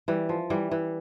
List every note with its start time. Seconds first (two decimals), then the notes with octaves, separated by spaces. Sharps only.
0.08 E3 G3
0.29 F3
0.50 E3 G3
0.71 E3